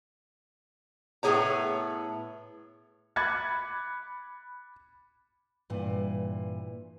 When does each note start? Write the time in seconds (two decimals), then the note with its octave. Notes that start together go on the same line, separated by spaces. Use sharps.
1.23 A2 B3 C#4 G#4 C#5 A#5
3.16 B5 D6 F#6 G#6 A6 C#7
5.70 G2 A#2 E3